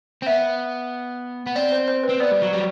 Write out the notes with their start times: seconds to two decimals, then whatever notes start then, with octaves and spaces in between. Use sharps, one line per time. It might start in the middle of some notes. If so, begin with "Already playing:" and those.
0.22 C4
0.26 B3 E5
1.46 B3
1.56 C4 D5
1.72 C5
1.88 C5
2.03 B4
2.09 C4
2.20 B3 D5
2.31 G3
2.42 F#3
2.53 G3